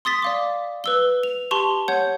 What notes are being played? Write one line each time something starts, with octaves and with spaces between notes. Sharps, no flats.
C6 D#6 A6 B6
D5 F5 D6
B4 E6 G7
F7
G4 A5 C6 C#6 F7
C#5 F#5 G6